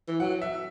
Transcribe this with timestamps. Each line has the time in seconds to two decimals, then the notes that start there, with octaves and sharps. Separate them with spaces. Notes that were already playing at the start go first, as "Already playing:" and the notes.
0.08 E3
0.20 F#3 F#5
0.42 E5